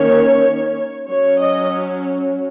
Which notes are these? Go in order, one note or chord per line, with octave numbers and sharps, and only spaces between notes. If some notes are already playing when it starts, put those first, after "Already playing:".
Already playing: D#3 A#3 C#4 C#5
F#3 C#4 C#5
D#5